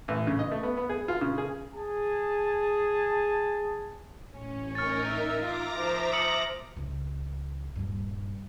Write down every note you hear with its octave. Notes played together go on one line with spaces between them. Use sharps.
A1
C#3
D#5
A3
B3
B3
G#4
F4
C#3
G#4
G#4 A5
A1 C#4
D#4 A#4 C#5 F6 A6
E5
F4 A#5 D6 A#6
F3 C5 E5 F5
D#6 C#7 F#7
C#2
D#1 G2